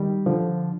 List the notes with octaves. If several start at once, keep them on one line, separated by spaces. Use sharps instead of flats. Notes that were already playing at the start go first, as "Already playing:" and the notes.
Already playing: D#3 G3
D3 F3